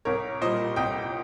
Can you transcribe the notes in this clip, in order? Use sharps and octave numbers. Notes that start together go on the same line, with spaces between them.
C2 A#4 C#5
A#2 G3 C5 D#5
C2 D#5 G5